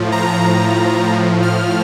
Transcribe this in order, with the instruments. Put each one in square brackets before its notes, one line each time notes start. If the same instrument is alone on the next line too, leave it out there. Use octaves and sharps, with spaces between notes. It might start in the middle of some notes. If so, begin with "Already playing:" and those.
Already playing: [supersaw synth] A2 F3
A#5
A#5
A2 F3
F6